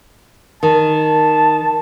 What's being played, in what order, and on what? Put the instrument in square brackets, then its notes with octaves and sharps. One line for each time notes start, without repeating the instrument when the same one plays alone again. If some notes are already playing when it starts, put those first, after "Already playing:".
[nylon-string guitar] D#3 [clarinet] A5